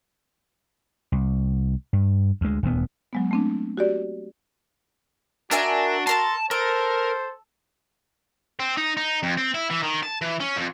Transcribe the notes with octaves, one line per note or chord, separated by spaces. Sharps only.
C2
G2
D2 G#3
D#1 D2 B3
F#3 G#3 B3
A3 C4 D4
F#4 G4 D5
D4 F#4 A#4 E5 G#5
A4 A#4 A5 C6
A4 A#4 C5
C4
D#4
D#4
F2
C4
E4
E3
D#3
A5
E3
C#4
F2